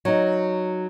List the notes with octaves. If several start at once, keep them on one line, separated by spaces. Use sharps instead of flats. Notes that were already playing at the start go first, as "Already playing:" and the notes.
F#3 D#4